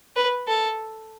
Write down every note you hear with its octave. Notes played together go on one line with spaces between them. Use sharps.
B4
A4